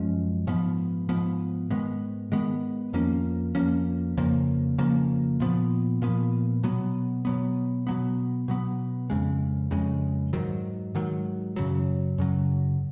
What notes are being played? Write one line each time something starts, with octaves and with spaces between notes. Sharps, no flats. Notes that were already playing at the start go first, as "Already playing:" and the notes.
Already playing: F#2 F3 G#3 C#4
G#2 F3 B3
G#2 F3 B3
G#2 D#3 G#3 B3
G#2 D#3 G#3 B3
F2 F3 A#3 C#4
F2 F3 A#3 C#4
F2 C#3 F3 A#3
F2 C#3 F3 A#3
A#2 F3 B3
A#2 F3 B3
B2 F#3 B3
B2 F#3 B3
B2 F#3 B3
B2 F#3 B3
F2 C#3 G#3
F2 C#3 G#3
G#2 D#3 F#3
G#2 D#3 F#3
F#2 C#3 F#3
F#2 C#3 F#3